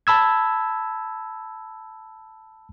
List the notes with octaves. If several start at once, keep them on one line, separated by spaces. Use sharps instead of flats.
A5 B5 E6 G#6